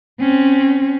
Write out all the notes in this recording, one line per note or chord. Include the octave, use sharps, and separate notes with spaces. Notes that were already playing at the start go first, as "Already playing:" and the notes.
C4 C#4